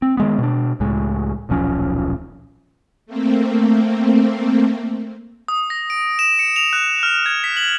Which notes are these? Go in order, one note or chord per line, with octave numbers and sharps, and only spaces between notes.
C4
D#3 G#3 B3
B2 D4
C#2 A2 G#3
D#1 B1 F3 C#4
A3 A#3 C4
D#6
A#6
D7
E7
C#7
F7
F#6
F6
G#6
B6
F#7